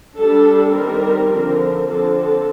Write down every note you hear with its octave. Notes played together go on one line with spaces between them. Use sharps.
G3 D4 A4
D#3 G3 C4 A#4
D3 F3 C4 A#4
D3 F3 C4 A4
A4